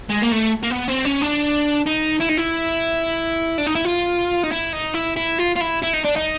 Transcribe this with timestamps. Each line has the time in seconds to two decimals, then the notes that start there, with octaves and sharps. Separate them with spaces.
0.10 G#3
0.23 A#3
0.32 A3
0.63 A#3
0.71 B3
0.88 C4
1.05 C#4
1.21 D4
1.87 D#4
2.20 E4
2.29 D#4
2.37 E4
3.58 D4
3.66 D#4
3.75 E4
3.85 F4
4.43 D#4
4.51 E4
4.73 D#4
4.94 E4
5.17 E4
5.39 F4
5.56 F4
5.61 E4
5.82 E4
5.93 D#4
6.04 D4
6.16 D#4